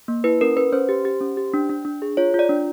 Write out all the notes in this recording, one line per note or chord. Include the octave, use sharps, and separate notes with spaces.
A#3
E4 B4
C#4 A#4
C#4 B4
C#4 C5
G4
G4
C#4
G4
D4
D4
D4
G#4
F4 C#5
F4
D5
D4